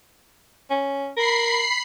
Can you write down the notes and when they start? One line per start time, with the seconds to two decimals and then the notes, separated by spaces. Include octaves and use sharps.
0.70 C#4
1.17 A#4 B5 C7